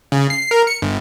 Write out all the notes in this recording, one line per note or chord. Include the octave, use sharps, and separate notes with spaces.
C#3
C7
A#4
C#7
G1